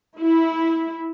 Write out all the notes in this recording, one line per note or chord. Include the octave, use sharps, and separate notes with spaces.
E4